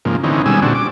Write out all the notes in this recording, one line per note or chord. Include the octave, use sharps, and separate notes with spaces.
G#2 C#3 F3 A#3
D3 E3 C4 C#4 D#4
B2 D#3 G3 G#3 G#5 E6
A#2 D3 C4 D4 F#4
D6